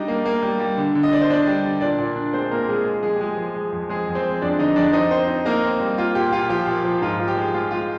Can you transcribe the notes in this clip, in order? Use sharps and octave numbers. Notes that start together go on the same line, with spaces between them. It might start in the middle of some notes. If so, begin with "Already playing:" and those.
Already playing: G3 D4 D#4 D#5
A#3
A#3
G3
G3
D3
D3
D#5
D3 D5
C5
D3 D4 D5
G3
D3
A#2 D4 D5
A#2
D4
G#3 C4 C5
A#2 A#3 A#4
A#2 G#3 G#4
G#3
F3 G#3 G#4
G4
F3 G#3 G#4
F3
G#3
F2
G#3 C4 G#4
F2
C4 C5
G#3
F2 D4 D5
D3 D#4 D#5
F2 D4 D5
C4 D#4 D#5
C4 C5
D#4
A#3 D#4 A#4
C4
G3
A#3 F4
A#2 G4
A#2 F4
F3 G4
A#2
F3
G#2 F4
F3
G4
G#3
G#3 F4
G#3 F4